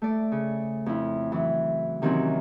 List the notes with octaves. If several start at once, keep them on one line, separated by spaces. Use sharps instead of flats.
A3 D5
C#3
F2 E4
E3 F#3
C3 D#3 E3 F#3 C4 C#4